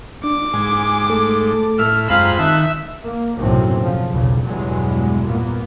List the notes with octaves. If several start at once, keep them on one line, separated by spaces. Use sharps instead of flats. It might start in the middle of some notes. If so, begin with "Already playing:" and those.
D4 D6
G#2 G#5
A3 A4
A2 E5 F6
F#2 G#3 C4 F4 F5 A#5 B5
D#3 E5 A5 F#6
A#3
F#1 B1 F#2 A2 C3 C4
C#3 F3
B1 E2 G2 C#3
E2 G2 B2 F#3 G#3
A#2 A#3 B3